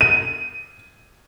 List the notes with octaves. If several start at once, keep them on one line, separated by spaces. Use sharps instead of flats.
D#7